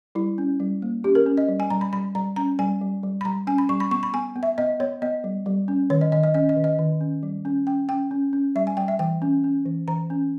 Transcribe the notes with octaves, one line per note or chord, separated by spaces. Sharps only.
G3 E4
C#4
G3
A#3
C#4 G4
A#4
C#4
D#5
G3
G#5
G3 A#5
B5
G3 B5
G3 A#5
C#4 A#5
G3 G#5
G3
G3
B5
G3 A#5
C#4 G#5
B5
G3 C#6
B5
B3 C#6
B5
B3 G#5
B3
E5
B3 D#5
B3 C#5
B3 D#5
G3
G3
C#4
D#3 C#5
D#5
D#3 D#5
D#5
C#4 D#5
D#5
D#3
D#5
D#3
C#4
G3
C#4
C#4 G5
C#4 G5
C#4
C#4
G3 E5
G#5
G3 G5
E5
E3 G5
C#4
C#4
E3
E3 A#5
C#4